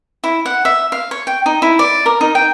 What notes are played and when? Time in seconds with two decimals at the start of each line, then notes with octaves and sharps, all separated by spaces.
0.24 E4
0.46 F#5
0.65 E5
0.92 F5
1.11 C#5
1.27 G5
1.46 D#4
1.62 E4
1.79 D5
2.06 A#4
2.21 D#4
2.35 G5